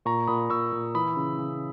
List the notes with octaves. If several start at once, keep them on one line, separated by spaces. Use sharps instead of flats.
A#2 A#5 C#6
A#2 B5 D#6
A#2 C#6 E6
A#2
E3 B5 D#6
C#3
C#3